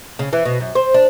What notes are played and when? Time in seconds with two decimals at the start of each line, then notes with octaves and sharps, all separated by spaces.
0.19 C#3
0.33 E3
0.45 B2
0.61 F#2
0.75 C5
0.94 D4